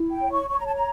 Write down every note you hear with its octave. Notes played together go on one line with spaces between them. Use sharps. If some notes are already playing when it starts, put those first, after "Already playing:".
Already playing: E4
G5
C#5
C#6
C#5 C#6
A#5
A5
A#5